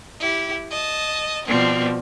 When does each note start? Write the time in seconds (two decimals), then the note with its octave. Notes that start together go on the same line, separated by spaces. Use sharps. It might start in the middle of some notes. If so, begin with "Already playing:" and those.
0.20 E4 G4
0.71 D#5 A5
1.46 B2 F3 G3 C4